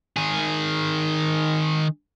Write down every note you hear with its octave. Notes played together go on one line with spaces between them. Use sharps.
D#3 G#4